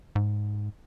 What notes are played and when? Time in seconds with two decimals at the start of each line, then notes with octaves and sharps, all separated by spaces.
0.15 G#2